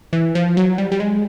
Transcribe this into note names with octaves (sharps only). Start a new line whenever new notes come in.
E3
F3
F#3
G3
G3
G#3